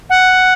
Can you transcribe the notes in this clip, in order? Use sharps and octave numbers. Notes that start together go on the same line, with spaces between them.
F#5